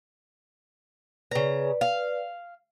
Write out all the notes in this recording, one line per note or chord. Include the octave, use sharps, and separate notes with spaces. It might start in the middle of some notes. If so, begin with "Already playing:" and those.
C#3 B4 D5 A#5
F5